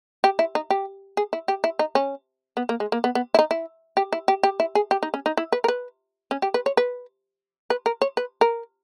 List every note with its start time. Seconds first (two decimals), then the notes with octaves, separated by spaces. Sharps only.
0.24 G4
0.39 E4
0.55 D#4
0.70 G4
1.17 G#4
1.33 E4
1.48 G4
1.64 E4
1.79 D#4
1.95 C#4
2.57 B3
2.69 A#3
2.80 G#3
2.92 A#3
3.04 B3
3.15 B3
3.34 E4
3.39 D#4
3.51 E4
3.97 G4
4.13 E4
4.28 G4
4.43 G4
4.60 E4
4.75 G#4
4.91 G4
5.03 D#4
5.14 C#4
5.26 D#4
5.37 E4
5.52 B4
5.64 A#4
5.68 B4
6.31 C#4
6.42 G4
6.54 B4
6.66 C#5
6.77 B4
7.70 B4
7.86 A#4
8.02 C#5
8.17 B4
8.41 A#4